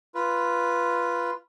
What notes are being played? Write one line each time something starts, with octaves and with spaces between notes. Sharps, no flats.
F4 B4